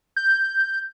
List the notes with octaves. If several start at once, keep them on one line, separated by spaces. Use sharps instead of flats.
G6